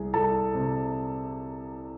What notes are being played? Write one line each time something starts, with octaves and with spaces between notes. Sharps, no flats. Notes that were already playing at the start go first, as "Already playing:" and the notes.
Already playing: C2 G#4
C2 A4 A5
C3